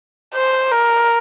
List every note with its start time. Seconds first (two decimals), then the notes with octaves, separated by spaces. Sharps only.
0.35 C5
0.72 A#4